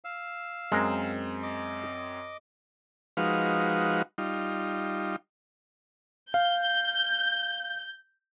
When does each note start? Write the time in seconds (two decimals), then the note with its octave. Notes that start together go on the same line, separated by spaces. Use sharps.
0.05 F5 E6
0.72 F#2 G#3 C4 A#4
1.43 D#5 D6
3.17 F3 G#3 D#4 F#4 B4 F5
4.18 G3 D#4 F4
6.34 F5 G6